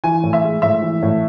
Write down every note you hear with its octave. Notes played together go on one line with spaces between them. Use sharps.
E3 G#5
A2
E5
G#3
A2 E5
E3
A2